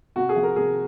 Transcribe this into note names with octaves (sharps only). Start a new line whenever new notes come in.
C3 F#4
G#4
F3
A#4
C3 G#4